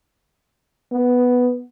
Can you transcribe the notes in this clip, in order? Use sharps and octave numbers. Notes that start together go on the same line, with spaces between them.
B3